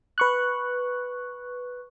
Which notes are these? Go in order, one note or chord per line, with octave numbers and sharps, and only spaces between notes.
B4 C#6 F#6